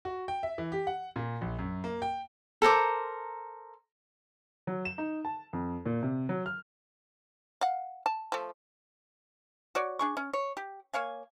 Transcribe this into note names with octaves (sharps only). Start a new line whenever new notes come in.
F#4
G5
E5
E3
G4
F#5
A#2
A#1
F#2
A#3
G5
A4 A#4 C5 D6
F#3
E7
D#4
A5
F2
A#2
C3
F#3
F6
F5 F#5
A5
F3 A3
F#4 C#5 D5
D4 G#4 C#6
C#4
C#5
G4
A#3 C#5 F5 G#5